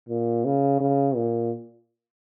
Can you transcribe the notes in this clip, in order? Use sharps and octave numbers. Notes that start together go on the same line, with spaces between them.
A#2
C#3
C#3
A#2